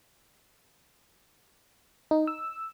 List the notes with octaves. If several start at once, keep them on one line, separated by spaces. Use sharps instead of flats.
D#4
E6